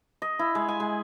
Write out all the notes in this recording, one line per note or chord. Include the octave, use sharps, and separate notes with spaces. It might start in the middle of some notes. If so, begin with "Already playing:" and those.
D#5
E4
G#3
G#5
G#3